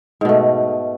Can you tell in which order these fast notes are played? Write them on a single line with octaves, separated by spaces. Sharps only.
G#2 B2 A3